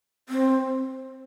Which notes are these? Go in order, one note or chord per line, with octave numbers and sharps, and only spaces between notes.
C4